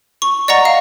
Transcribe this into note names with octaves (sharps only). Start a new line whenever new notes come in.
C#6
D5 D#5 F#5 A#5 C#6
F5